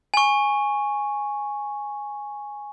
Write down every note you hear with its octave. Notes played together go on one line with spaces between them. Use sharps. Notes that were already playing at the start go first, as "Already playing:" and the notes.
G#5 C#6